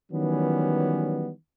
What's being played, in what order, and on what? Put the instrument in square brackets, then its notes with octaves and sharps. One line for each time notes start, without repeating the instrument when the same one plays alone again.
[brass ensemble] D#3 E3 F#3 G3 B3 C#4